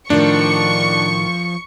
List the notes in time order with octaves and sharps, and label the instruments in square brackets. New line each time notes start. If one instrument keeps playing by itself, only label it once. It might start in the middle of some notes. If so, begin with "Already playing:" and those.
[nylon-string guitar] A2 D#3 [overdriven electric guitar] F3 [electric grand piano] D4 [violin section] C#6